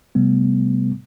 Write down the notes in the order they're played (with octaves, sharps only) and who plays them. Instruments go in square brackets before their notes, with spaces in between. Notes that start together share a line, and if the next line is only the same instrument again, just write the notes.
[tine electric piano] C3 G3 A3 B3